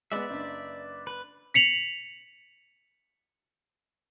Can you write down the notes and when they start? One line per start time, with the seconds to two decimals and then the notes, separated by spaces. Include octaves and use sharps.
0.12 G#3 B3 B4 D5 E5
0.30 F#1 D4
1.07 B4
1.54 B6 C#7 F7 F#7